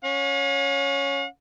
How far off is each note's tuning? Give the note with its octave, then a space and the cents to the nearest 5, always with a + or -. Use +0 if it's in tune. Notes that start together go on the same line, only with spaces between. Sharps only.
C#4 +0 F5 +45